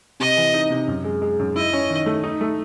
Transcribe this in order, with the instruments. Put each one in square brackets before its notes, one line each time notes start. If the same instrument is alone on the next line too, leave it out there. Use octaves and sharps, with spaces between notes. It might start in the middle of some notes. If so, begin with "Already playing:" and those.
[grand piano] C3 [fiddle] D#5
[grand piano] E3
D#4
C3
F#2
G#3
G#3
F#2
[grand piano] E4 [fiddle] D#5
[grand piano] C#4
D#3
A3
D#4
A3